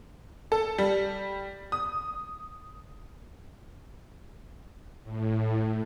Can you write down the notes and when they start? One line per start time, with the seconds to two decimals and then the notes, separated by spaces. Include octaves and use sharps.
0.52 A4
0.78 G3
1.72 D#6
5.03 A2